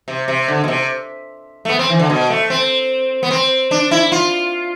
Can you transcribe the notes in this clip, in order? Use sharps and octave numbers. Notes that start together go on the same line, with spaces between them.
C3
C3
D3
B2
C3
A3
B3
C4
E3
D3
B2
A3
C4
B3
C4
D4
E4
F4